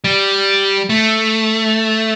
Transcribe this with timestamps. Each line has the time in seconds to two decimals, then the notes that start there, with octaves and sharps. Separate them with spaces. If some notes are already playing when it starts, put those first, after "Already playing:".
0.04 G3
0.89 A3